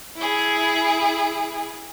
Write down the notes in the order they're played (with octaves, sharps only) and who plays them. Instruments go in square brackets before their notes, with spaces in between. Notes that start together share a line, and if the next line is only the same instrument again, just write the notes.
[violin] E4 G#4